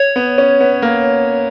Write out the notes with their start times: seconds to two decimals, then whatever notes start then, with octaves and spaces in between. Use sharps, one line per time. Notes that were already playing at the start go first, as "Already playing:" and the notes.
Already playing: C#5
0.16 B3
0.38 C#4
0.60 B3
0.82 A#3